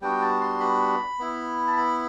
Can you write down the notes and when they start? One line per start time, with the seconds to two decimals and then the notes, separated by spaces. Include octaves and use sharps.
0.01 G3 B3 D4 F#4 G5
0.21 A5
0.41 C6
0.60 B5
1.19 B3 E4
1.67 A5
1.77 B5